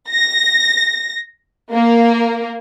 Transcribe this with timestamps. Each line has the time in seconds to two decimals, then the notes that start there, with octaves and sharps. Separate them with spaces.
0.10 A#6
1.72 A#3